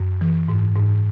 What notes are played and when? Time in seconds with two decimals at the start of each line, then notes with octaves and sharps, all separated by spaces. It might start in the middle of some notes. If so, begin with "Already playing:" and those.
Already playing: F#2
0.21 E3
0.49 G#2
0.75 G#2